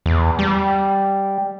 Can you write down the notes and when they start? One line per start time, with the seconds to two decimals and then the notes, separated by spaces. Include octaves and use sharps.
0.06 E2
0.39 G3